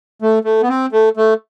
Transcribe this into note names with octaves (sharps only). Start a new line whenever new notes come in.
A3
A3
B3
C4
A3
A3